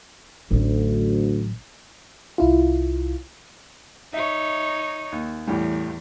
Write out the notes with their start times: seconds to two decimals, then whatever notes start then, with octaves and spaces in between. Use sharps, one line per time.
0.51 A1 D2 F#3
2.38 C2 E4 F4
4.13 D#4 C#5 E5
5.12 D#2
5.47 E2 A2 E3 G3